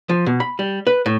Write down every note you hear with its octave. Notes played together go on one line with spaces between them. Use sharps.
F3
B2
B5
G3
B4
A2